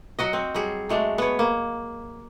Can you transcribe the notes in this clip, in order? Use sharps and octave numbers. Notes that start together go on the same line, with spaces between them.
F#3 F#4 D#5
C4
F#3 G3 G#4
F#3 G#3 A3 D4
B3 C#5
A#3